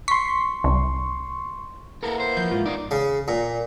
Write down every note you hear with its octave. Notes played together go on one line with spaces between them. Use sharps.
C6 C#6 B6
C2
A#3 B3 E4 A4 A#4
C5
F3 G6
G#2 F4
B3 D#4 D5
C#3
A#2